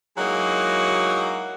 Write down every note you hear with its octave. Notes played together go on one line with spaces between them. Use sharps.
F#3 G#3 A#3 D#4 E4 F#4